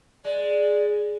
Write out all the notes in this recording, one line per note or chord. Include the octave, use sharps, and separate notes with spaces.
G#3 D5